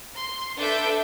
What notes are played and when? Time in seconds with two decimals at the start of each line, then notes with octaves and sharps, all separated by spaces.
0.16 C6
0.57 D4 A4 B4 E5 G6 D7